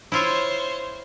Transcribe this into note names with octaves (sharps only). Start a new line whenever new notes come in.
E4 F4 C5 C#5 E5